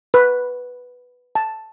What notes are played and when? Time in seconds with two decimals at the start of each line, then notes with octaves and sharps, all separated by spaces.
0.14 B4
1.35 A5